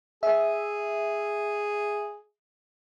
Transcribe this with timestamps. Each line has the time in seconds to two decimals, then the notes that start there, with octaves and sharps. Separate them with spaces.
0.23 G#4 E5